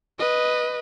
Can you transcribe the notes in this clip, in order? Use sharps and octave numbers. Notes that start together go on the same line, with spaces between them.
B4 D#5